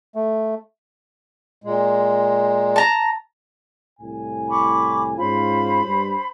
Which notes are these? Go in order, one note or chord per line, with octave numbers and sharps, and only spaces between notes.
A3
A#2 G#3
A5 A#5
C2 A2 G#5
B5 C#6 D6
G#2 C#4 F4 C5 B5
G2